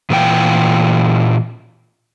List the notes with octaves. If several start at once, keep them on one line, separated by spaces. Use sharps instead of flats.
A#2 E3 F4 A#4 G5